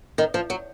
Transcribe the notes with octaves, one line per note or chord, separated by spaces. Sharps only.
D#3
F3
F#3